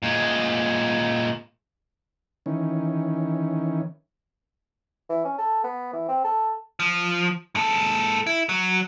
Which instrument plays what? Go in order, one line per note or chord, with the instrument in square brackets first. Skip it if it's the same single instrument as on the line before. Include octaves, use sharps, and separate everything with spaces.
[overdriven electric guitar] A#2 G#3
[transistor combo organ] D#3 E3 C#4
[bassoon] E3
C#4
A4
B3
E3
C4
A4
[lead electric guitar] F3
G#2 A4
E4
F#3